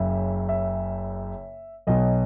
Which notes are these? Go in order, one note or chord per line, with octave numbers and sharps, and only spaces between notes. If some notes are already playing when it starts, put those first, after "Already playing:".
Already playing: F#1 F#2 C#3 E5
E5
B1 B2 F#3 D#5